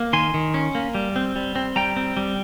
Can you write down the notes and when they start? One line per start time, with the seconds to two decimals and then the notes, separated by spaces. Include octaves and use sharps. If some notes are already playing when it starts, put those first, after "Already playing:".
Already playing: A#3
0.13 D#3 G#5 C6
0.34 D#3
0.54 C#4
0.75 A#3
0.95 G3
1.16 C4
1.36 G3
1.56 C4
1.76 G3 G5 A#5
1.97 C4
2.17 G3